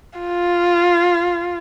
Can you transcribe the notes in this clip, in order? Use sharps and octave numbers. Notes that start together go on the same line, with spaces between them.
F4